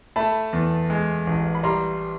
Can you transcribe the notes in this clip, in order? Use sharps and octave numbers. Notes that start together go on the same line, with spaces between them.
A3 A5 B5
E2
G#3
A1
B5
G3 A#5 C6